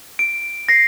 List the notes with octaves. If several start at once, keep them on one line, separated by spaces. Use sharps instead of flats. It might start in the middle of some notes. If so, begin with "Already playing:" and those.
D7
A#6 C7